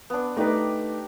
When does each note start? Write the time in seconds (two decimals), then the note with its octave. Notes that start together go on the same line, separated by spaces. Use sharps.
0.10 B3 D4
0.37 A3 D#4 G4 B4 D5 A#5